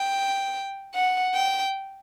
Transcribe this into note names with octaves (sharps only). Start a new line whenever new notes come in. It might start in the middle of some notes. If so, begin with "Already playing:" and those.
Already playing: G5
F#5
G5